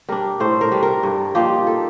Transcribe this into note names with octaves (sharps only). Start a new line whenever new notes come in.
G3 D4 A#4
A2 C5
A#4
G3 D4
A#4
G2
F3 A#3 D#4 G4
A4